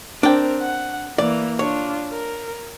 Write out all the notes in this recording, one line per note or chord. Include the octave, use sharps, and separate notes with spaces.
C4 D4 A#4 G5
F#5
E3 A#3 D5
D4 F4 C#5
A#4